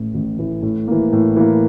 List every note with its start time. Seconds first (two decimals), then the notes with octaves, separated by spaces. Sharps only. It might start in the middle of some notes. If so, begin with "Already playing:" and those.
Already playing: A1 A2 E3
0.14 A1
0.38 A2 E3
0.62 A2
0.87 E3 A#3
1.13 A2
1.36 E3 A#3